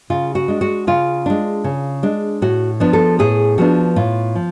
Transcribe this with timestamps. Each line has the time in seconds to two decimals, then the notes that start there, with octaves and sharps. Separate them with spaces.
0.10 C#3 F4
0.35 F#4
0.48 G#3 D4
0.61 F#4
0.87 C#3 F4
1.26 G#3 D4
1.64 C#3
2.03 G#3 D4
2.42 A2 F#4
2.80 F3 B3 D4
2.93 A4
3.19 A2 G#4
3.58 F3 B3 D4 F#4
3.96 A2 F4
4.35 F3